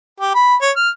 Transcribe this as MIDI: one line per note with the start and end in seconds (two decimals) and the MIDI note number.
0.20 0.35 67
0.35 0.55 83
0.62 0.71 73
0.76 0.89 89